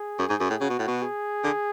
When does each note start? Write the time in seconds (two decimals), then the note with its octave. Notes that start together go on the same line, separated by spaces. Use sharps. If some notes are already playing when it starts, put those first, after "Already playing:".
Already playing: G#4
0.19 F#2
0.30 G#2
0.40 F#2
0.50 A2
0.60 C#3 F#4
0.70 B2
0.79 A2
0.87 B2
1.02 G#4
1.44 D3